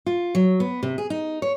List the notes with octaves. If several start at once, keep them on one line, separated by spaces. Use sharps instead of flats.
F4
F#3
B3
C3
G#4
D#4
C#5